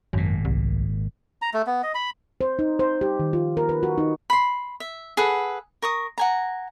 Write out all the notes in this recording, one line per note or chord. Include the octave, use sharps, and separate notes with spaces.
G#1 F#2 A#2
C2
A#5
A3
B3
D#5
B5
C5
D#4
C5
G4
D#3
F4
A#4
B4
F#4
D#4
B5 C6
E5
G#4 A4 B4 F#5
A#4 C#6 D#6
F#5 G#5 A#5